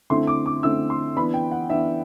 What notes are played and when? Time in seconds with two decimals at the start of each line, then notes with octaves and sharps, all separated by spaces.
0.10 D3 A3 C4 E4 C6
0.27 D6
0.46 D6
0.63 D3 A3 C4 E4 E6
0.90 C6
1.16 E3 B3 D4 B5
1.34 G5
1.51 F#5
1.70 E3 B3 D4 E5